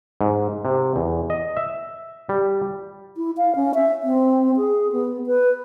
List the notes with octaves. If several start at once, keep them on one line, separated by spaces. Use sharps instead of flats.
G#2
C3
E2
D#5
E5
G3
E4
F5
C#4
E5
C4
G#4
B3
B4